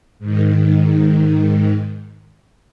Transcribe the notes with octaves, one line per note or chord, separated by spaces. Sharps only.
G#2 D#3